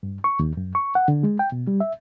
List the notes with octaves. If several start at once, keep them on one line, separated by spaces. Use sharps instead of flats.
G2
C#6
D#2
F#2
C#6
F#5
D3
G#3
G5
B2
G3
E5